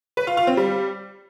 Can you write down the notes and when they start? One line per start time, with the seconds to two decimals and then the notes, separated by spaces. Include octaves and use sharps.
0.17 B4
0.27 F4
0.37 F4
0.47 C4
0.57 G3